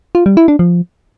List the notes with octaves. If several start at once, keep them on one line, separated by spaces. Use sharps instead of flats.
F4
G3
E4
D4
F3